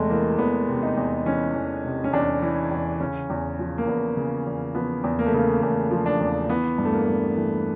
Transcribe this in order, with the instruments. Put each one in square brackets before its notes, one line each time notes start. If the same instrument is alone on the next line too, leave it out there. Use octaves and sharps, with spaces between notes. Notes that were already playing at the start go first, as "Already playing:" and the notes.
Already playing: [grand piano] E2 C3 G#3 A3
E3 A#3
E2 B3
C3
D#4
E2
E3 C#4
E2
C3
C#4
E2 D4
E3
E2
C#3 C#4
E2
F3
A#3
E2 B3
C#3
E2
F3 B3
E2
A#3
A3
C#3 A#3
E2 A3
F3
D4
E2
E3 B3
G2
A3
A#3
G2
E3 A3